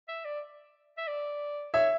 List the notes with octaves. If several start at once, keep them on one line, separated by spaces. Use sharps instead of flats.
E5
D5
E5
D5
C#5 E5